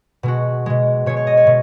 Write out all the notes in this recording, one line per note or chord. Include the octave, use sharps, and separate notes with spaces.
B2 G#3 F#4
B2 G#3
B2 G#3 C#5
C#5
D#5
C#5
B2